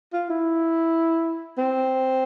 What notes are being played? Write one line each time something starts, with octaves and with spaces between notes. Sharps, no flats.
F4
E4
C4